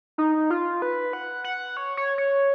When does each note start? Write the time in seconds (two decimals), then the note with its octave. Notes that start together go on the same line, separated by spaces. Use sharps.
0.18 D#4
0.50 F4
0.82 B4
1.13 F#5
1.44 F#5
1.77 C#5
1.97 C#5
2.18 C#5